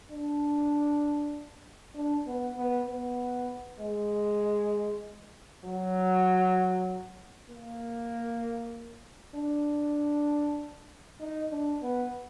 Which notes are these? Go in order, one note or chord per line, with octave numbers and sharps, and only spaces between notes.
D4
D4
B3
B3
B3
G#3
F#3
A#3
D4
D#4
D4
B3